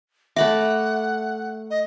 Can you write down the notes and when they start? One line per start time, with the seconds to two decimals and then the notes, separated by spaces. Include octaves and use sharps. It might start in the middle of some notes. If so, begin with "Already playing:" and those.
0.36 A3 E5 F#5 B5 D6
1.70 D#5